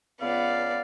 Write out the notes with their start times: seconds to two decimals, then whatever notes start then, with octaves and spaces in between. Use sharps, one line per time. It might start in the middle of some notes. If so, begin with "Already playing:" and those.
0.21 C#2 B3 D5 F5